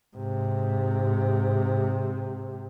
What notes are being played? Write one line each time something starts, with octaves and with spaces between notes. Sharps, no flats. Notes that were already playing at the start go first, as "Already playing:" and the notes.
G#2 C3